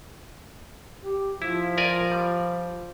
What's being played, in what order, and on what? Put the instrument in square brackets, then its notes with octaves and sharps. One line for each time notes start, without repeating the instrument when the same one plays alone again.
[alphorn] G4
[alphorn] F3 [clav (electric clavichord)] E4
[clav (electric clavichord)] A#4 D5 G#5
G3